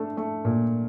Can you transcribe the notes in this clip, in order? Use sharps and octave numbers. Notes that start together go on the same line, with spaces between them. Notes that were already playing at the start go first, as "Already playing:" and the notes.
Already playing: A3 D4
A3
A#2